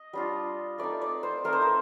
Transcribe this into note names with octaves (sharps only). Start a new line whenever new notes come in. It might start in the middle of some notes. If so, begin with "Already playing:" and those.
Already playing: D#5
G3 D4 F4
A3 C4 D#4 D5
D5
C5
A3 C4 D#4 A#4
C5
A#4